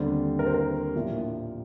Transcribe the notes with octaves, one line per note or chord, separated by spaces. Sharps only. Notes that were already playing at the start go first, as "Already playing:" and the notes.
Already playing: D#2 D3 G3 C4 C5
A#4
C5
A#4
A#1 A2 F3 A#3